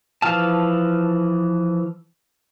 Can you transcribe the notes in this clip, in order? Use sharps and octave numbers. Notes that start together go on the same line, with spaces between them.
E3 F3 F5 A5